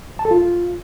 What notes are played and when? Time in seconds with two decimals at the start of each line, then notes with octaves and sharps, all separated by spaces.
0.19 A5
0.25 A4
0.31 F4